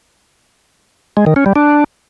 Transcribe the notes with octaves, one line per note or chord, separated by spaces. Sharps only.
G#3
D#3
C#4
G3
D4